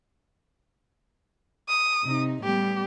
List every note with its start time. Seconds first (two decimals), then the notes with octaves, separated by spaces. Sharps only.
1.69 D#6
2.04 C3 D#4
2.44 A2 G3 B3 G4